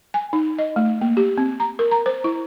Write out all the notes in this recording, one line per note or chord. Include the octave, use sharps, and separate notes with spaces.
G#5
D#4
D#5
A3
A#3
G4
C4
A#5
A#4
A#5
C5
E4